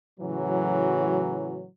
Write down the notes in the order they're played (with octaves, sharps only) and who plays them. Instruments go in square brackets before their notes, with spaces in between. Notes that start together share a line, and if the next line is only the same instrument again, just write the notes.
[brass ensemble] A2 C#3 E3 F#3